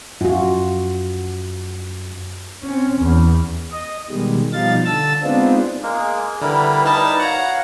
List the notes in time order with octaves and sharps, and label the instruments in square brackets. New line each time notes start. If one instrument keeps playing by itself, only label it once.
[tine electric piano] F#2 [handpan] F4 F#4
[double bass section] C4 C#4
E2
[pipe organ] D#5
B2 D#3 G3 G#3
B2 F3 G3 D#4 F5 A6
D3 A5 E6 A6
G#3 B3 C4 D4 D#4 F4
[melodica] G#3 A#3 A#4 [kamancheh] G#4
[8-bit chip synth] D3 [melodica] G3 E4 A#4 [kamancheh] B4 A#5
[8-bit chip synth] D#4 A5
[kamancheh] F#4 F5 [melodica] C#5 [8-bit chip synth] F#5 A#5